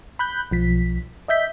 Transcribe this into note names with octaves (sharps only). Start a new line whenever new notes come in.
B5 F#6 G6
B1 F3 B6
D#5 E5 G6 B6